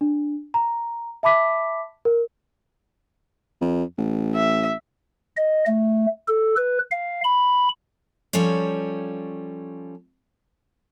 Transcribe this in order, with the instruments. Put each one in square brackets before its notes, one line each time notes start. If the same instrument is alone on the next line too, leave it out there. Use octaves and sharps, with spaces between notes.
[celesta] D4
A#5
E5 A5 B5 D6 B6
A#4
[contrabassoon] F2
A1
[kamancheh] E5
[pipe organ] D#5
A3
A4
B4
F5
B5
[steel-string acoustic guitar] F3 G3 C#4 A4 C#5